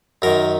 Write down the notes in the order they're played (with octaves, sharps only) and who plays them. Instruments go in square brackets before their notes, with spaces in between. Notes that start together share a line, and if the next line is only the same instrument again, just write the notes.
[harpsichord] F#2 D#3 A#4